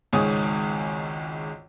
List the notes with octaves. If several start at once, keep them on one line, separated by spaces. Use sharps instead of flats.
G#1 C#2 G#2 C#5 G#5 D#6